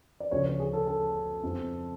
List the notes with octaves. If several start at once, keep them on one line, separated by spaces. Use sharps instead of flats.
D5
D2 C#3 F3 C#5
C#5
G#4
A4
A4
F2 F3